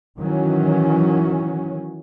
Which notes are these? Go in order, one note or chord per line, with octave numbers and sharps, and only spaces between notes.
D#3 E3 F#3 C#4